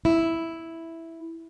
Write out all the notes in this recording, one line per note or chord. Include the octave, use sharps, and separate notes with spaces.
E4